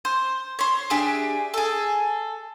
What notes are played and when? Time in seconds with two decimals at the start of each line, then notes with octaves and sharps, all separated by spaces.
0.05 C5
0.59 C5 C#5
0.90 D4 G4 G#4 E5
1.54 G#4 A4